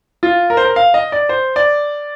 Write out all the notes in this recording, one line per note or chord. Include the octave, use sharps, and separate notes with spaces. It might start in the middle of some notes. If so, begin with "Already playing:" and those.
F4
A#4
C5
A#4
F5
D#5
D5
C5
D5